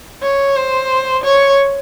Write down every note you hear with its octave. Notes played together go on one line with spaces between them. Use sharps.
C#5
C5
C#5